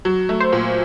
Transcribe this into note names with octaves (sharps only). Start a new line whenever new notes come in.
F#3
A3
C5
A#2